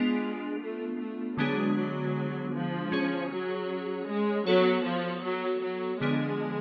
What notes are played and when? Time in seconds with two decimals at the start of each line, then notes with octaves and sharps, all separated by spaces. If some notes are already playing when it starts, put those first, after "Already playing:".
Already playing: G#3 B3 D4 F4
0.60 A3
0.99 A3
1.37 D3 F#3 G#3 B3 D4 G#4
1.76 F#3
2.53 F3
2.92 C#4 G#4 C#5
3.30 F#3
4.08 G#3
4.46 F#3 B3 F#4 A4 C#5
4.85 F3
5.24 F#3
5.63 F#3
6.01 D3 F3 G#3 B3 D4 G#4